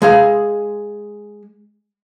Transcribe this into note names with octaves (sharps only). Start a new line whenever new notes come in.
G#3 G#4 F5